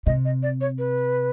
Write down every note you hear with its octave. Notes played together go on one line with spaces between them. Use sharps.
C3 D#5
D#5
D5
C#5
B4